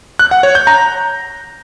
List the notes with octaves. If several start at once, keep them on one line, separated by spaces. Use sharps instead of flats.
F#6
F#5
C#5
G6
A#5